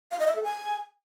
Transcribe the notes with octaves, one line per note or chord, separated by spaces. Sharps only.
F5
D#5
E5
A4
G#5